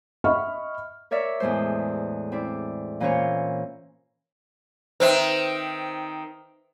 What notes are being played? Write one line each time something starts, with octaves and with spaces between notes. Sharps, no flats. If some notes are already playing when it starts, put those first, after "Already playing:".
D#5 E5 F#5 B5 C#6 F6
A#4 C#5 D5 E5
E2 A2 G#3 C5
C4 E4 D5
A#2 E3 A#3 C#4 C5 C#5
D#3 C4 B4 C5 E5